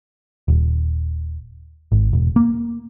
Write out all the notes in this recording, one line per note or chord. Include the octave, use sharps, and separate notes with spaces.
D#1
G#1
E1
A#3